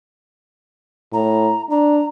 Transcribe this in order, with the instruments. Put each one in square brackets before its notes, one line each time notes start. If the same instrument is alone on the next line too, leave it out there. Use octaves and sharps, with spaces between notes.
[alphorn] A2 [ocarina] A#5
[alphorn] D4 [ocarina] A#5